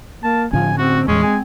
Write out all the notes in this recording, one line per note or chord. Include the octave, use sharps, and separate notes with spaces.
A#3 A5
A2 D3 F3 C#4 G#5
C4 F#4
D#2 A2 E3 G#3 C#4
C4 G#5